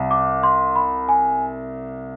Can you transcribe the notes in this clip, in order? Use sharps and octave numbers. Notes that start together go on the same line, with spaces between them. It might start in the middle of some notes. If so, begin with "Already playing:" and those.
Already playing: C2
D6
C6
B5
G#5